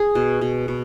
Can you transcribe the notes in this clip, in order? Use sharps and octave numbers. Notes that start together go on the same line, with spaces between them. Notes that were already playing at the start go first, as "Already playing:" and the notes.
Already playing: G#4
B2
B2
B2